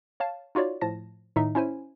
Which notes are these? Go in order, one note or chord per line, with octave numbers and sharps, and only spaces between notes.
C#5 F5 A5
D#4 F4 F#4 C#5 D5
A2 F3 A5 A#6
A2 D#3 D#4 E5
C#4 E4 C5 G#5